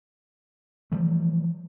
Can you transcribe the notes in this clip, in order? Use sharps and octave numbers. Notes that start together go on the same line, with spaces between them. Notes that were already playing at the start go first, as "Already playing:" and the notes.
E3 F3 G3 A3